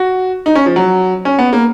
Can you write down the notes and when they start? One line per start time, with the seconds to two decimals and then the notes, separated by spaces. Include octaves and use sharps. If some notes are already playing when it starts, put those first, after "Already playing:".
Already playing: F#4
0.46 D#4
0.55 C#4
0.66 F3
0.76 F#3
1.25 C#4
1.39 B3
1.53 A#3